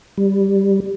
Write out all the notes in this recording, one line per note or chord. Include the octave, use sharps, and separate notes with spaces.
G3